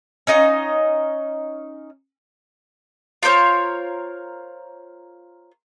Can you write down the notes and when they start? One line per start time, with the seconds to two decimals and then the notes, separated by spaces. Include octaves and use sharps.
0.27 C#4 D#4 D#5 F5
3.23 F4 A#4 C5 C#5